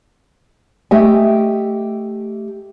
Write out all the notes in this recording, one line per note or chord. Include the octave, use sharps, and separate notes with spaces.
A3 G4 D#5 E5 G#5